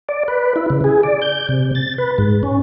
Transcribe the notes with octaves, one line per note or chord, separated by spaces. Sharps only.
D5
B4
E4
C#3
G#4
D5
G6
C3
A6
B4
G#2
C#4